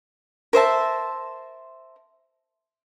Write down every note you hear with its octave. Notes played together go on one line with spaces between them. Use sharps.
A#4 C5 E5 A5